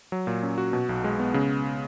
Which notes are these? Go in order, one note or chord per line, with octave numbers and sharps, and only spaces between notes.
F#3
A#2
C#4
F#4
B2
B1
G#3
B3
C#3